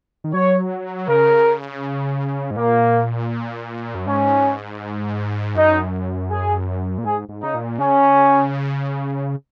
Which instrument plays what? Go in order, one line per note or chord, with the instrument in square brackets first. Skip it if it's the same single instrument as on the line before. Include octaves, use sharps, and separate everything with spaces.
[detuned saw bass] D#3
[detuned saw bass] F#3 [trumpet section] C#5
[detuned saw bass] C#3 [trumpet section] A#4
[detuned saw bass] G#2
[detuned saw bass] A#2 [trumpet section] A#3
[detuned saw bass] F#2
[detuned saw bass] G#2 [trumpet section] C#4
[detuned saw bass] F#2 [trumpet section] D#4
[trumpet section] G#4
[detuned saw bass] A#2
[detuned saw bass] G#2 [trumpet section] G#4
[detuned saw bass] G#2
[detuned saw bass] C#3 [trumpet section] D#4
[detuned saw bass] A#2
[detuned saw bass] C#3 [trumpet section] C#4